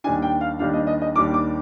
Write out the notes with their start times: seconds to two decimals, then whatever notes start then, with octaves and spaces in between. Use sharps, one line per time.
0.04 D#2 D#3 G3 D4 G#5
0.22 G5
0.41 F5
0.59 D#2 D#3 G3 D4 F5
0.74 D#5
0.87 D#5
1.02 D#5
1.15 D#2 D#3 G3 D4 D6
1.34 D6